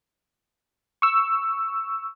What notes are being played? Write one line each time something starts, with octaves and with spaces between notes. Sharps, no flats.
C#6 E6